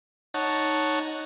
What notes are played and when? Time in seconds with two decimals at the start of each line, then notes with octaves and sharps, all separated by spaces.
0.34 D#4 C#5 F#5 A5